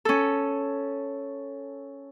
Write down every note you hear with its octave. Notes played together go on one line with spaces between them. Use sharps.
C#4 A4